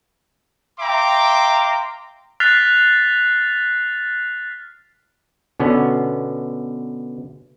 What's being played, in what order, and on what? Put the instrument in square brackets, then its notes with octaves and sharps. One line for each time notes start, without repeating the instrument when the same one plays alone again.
[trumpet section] E5 F5 G5 A#5 C6 D6
[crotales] F6 F#6 A6 B6 C7 F7
[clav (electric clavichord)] B2 D3 B3 C#4